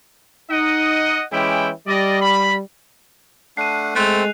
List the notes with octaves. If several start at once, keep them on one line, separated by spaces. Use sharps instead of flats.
D#4 D#5 F#5
E3 G#3 C#4 E4 G4 G5
G3 D5 D#5
B5
A3 D4 F#5 C7 D#7
G#3 A3 C4 C5 F#6 F7